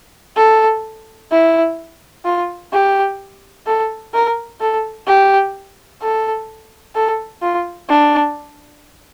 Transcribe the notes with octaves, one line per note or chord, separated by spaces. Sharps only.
A4
E4
F4
G4
A4
A#4
A4
G4
A4
A4
F4
D4